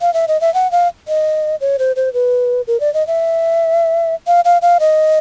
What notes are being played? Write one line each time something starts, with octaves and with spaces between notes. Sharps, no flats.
F5
E5
D#5
E5
F#5
F5
D#5
C#5
C5
C5
B4
A#4
D5
D#5
E5
F5
F5
F5
D#5